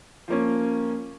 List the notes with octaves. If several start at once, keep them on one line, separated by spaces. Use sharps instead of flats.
F3 A#3 C#4